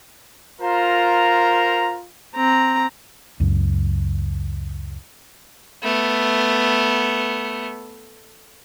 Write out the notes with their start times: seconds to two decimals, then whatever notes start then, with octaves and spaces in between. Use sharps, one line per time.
0.61 F4 A#4 C5 A#5
2.36 C4 A#5
3.40 C#2 F#2
5.83 A3 B3